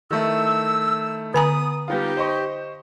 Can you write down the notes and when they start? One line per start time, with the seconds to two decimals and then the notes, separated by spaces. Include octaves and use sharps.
0.11 D#3 A3 E4 E6
1.34 D3 B3 G#5 A#5 D#6
1.88 G3 B3 D#4 F4 G4
2.17 C5 D#5 C#6